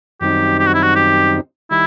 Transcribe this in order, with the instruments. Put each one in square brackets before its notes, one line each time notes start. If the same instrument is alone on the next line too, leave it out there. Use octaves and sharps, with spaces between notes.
[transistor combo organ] F#2 D#3 G3 C4 D#4 [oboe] G4
[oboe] G4
F#4
E4
F#4
G4
[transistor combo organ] D#3 G3 [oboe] E4